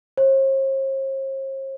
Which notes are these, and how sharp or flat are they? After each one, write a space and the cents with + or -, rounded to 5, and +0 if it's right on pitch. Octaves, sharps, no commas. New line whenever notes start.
C5 +45